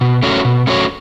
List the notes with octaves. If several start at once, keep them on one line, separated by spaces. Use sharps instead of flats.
B2
A3 C#4 F#4 C#5
B2
A3 C#4 F#4 C#5